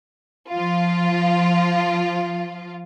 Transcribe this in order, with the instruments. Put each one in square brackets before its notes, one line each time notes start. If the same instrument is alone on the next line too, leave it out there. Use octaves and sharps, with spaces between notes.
[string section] F3 F4